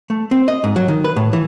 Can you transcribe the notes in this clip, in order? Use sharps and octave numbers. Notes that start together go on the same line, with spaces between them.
A3
C4
D#5
G#2
F#3
D#3
B4
A2
E3